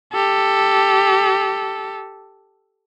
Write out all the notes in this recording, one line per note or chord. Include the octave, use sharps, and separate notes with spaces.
G4 A4